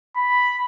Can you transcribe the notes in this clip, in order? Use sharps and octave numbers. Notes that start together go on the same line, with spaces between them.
B5